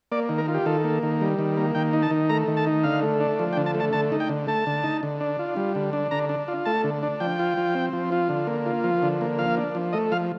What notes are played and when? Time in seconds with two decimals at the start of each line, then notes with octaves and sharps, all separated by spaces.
0.12 A#3 D5
0.29 D#3
0.38 A#4
0.48 F4
0.54 G4
0.66 D#3 A4
0.84 A#3
1.03 D#3
1.21 G3
1.39 D#3
1.57 A#3
1.75 D#3 G5
1.93 D#4
2.02 A5
2.11 D#3
2.29 A3 A#5
2.48 D#3
2.57 A5
2.67 D#4
2.84 D3 F5
3.02 A3
3.20 D4
3.39 F3
3.53 G5
3.57 D3
3.66 A5
3.75 A3
3.80 A5
3.93 D3 A5
4.12 D#4
4.20 G5
4.29 D3
4.47 A3 A5
4.67 D3
4.84 D#4
5.03 D3
5.20 D4
5.39 F4
5.56 G3
5.75 D3
5.93 D4
6.11 D3 A#5
6.29 D4
6.48 F4
6.65 A3 A5
6.84 D3
7.03 D4
7.20 F3 G5
7.39 F4
7.57 F3
7.75 C4
7.93 F3
8.12 F4
8.29 D3
8.47 A#3
8.66 F4
8.84 F3
9.02 D3
9.21 A#3
9.39 F3 F5
9.57 D4
9.75 F3
9.93 A3 D#5
10.12 F3 F5